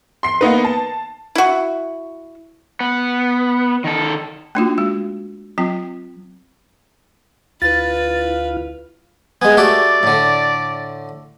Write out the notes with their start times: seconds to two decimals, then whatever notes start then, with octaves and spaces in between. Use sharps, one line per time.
0.23 C6 C7
0.41 A#3 B3 D#4 B4
0.65 A5
1.35 E4 F#4
2.80 B3
3.84 D#3 A4
4.55 A3 A#3 D4 D#4 F4 F#4
4.78 G#3 F#4
5.58 F#3 C4 F4 G5
7.62 D2 E4 F4 B4 F5 A6
9.42 G#3 B3 G#5
9.57 A3 F#4 G4 D5
10.03 A2 D3